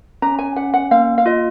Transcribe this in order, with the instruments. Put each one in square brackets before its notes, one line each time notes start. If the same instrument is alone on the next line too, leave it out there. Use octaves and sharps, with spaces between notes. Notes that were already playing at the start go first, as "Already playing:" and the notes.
[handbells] C#4 [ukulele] A#5
[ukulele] G#5
[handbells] C#4 [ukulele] F#5
[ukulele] F#5
[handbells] A#3 [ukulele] F5
[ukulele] F5
[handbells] F4 [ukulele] D#5